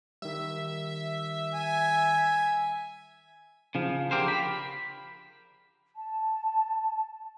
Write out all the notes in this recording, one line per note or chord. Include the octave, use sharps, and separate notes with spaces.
D#3 G3 E5
G#5
C#3 F3
D3 G4 A#4 C5
B5
A5